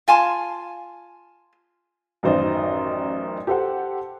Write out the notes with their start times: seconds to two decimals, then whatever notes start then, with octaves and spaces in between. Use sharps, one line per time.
0.08 F4 G#5 A5 C6
2.23 A1 F#2 D#3 C5 D5 D#5
3.47 G4 A4 C5 F#5